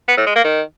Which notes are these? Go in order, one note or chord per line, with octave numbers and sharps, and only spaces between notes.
B3
A2
G#3
A#3
D#3